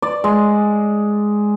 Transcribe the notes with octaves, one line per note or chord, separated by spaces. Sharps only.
D5
G#3